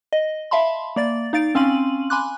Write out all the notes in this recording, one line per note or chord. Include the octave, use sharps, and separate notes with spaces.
D#5
E5 F5 A5 B5 C6
A#3 D5 A6
D#4 F5 A6 D7
C4 C#4 F5 C6 D#7 F#7
G#5 B5 C6 D6 F#6